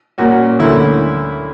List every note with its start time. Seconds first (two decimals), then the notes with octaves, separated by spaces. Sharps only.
0.18 A#2 A#3 C#4 F#4
0.59 D2 D3 A#3 C#4 E4